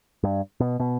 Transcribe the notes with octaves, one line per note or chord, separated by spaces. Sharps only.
G2
B2
B2